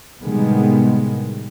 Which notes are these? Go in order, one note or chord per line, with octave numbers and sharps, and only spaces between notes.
A2 C3 D#3 G3 G#3 B3